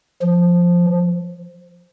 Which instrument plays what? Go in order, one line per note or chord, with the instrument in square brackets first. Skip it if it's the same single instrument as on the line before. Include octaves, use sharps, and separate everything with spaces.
[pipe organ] F3